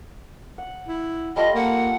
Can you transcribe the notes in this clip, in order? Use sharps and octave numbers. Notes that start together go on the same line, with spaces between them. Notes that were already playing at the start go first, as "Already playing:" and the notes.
F#5
E4
G3 A3 F4 D#5
A#3 F#5